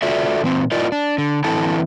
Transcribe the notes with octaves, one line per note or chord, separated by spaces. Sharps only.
F4 F#4 A4 D5 E5
A#2 E3 C4
E4 F4 A#4 D5 D#5
D4
D3
D3 E3 C4 E4 A4 A5